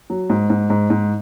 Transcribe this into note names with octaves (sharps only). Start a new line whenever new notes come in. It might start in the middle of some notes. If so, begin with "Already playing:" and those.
F#3
G#2
G#2
G#2
G#2